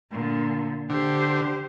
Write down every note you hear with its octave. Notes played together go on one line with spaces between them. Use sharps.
A#2 D3
D3 G4 C5